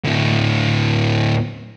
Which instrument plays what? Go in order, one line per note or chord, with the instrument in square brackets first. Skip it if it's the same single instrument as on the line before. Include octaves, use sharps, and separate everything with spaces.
[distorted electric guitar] D2 A2